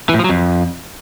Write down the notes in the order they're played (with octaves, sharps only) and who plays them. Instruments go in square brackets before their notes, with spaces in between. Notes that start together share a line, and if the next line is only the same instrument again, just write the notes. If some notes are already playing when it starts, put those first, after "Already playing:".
[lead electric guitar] E3
A2
F3
F#3
F2